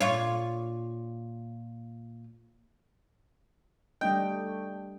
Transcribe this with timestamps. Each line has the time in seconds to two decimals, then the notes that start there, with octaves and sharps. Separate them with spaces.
0.01 A#2 F4 C#5
4.01 G3 A3 D4 D#5 G5